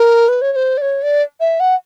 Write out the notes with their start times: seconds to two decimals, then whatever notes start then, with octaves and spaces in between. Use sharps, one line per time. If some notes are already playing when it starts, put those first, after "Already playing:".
Already playing: A#4
0.28 B4
0.42 C#5
0.53 C#5
0.56 C5
0.77 D5
0.82 C#5
1.03 D5
1.40 E5
1.60 F#5